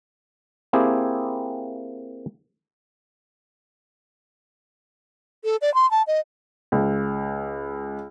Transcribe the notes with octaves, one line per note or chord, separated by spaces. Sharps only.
A#3 C4 E4 G4 G#4
A4
D5
C6
A5
D#5
C#2